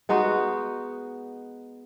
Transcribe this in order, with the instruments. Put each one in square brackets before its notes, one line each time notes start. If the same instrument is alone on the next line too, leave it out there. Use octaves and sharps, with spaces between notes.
[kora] G#3 B3 D#4 F#4